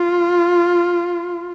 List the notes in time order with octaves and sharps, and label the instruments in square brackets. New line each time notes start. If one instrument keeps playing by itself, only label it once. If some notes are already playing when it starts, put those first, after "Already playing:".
Already playing: [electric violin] F4